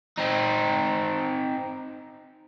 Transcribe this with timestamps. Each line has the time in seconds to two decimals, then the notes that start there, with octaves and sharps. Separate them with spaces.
0.18 C4 D#4